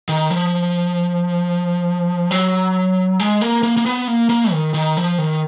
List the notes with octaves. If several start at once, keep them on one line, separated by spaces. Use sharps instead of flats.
D#3
F3
F#3
G#3
A#3
A#3
A#3
B3
A#3
A#3
D#3
D#3
F3
D#3